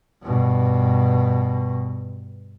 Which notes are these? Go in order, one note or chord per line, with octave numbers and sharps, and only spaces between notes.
G2 B2